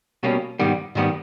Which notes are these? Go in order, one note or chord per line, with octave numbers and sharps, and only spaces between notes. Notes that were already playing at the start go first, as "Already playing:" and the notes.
B2 G3 A#3 C#4
G#2 D#3 G3 B3
G#2 D#3 G3 B3